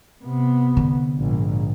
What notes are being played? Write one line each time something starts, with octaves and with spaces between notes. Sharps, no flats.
C3 B3
D3
A#1 G#2